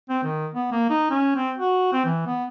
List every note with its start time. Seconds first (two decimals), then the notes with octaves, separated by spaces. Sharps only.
0.09 C4
0.24 D#3
0.54 B3
0.72 A#3
0.90 D#4
1.10 C#4
1.36 C4
1.58 F#4
1.93 C4
2.05 E3
2.26 B3